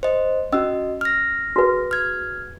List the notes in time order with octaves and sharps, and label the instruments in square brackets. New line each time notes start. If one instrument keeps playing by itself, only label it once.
[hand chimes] C5 D#5
[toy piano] C#4 E6 [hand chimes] F#4 D#5
[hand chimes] F6 A#6
[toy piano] F#4 G#4 B4
[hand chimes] F6 G#6